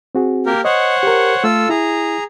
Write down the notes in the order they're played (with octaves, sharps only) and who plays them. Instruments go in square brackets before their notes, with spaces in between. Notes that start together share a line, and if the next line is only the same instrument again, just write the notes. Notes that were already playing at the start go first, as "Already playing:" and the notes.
[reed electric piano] C4 F#4 G#4
[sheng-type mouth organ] A#3 G4 A#4
[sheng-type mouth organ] C5 C#5 F#5 [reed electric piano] D#5
[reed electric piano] G4 A#4
[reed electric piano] A3 [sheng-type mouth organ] F4 A4 E6
[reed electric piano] E4 [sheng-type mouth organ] G#4 A#5